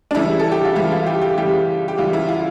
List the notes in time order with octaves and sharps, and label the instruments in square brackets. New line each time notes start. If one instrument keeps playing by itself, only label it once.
[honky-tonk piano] D4
C#3 E3 G3 E4
A4
G4
F4
C#3 E3 G3 E4
F4
G4
G4
C#3 E3 G3 G4
G4
C#3 E3 G3 F4
E4
F4